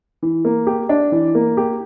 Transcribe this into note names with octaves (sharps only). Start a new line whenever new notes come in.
E3
A#3
G4
D4
E3
A#3
G4